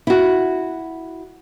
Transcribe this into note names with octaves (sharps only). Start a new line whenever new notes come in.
E4 F#4